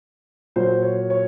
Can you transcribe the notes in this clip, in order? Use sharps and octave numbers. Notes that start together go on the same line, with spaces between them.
A#2 F#3 C5
C#5
C#5